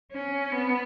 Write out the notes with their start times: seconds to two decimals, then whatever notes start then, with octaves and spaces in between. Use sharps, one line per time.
0.12 C#4
0.52 B3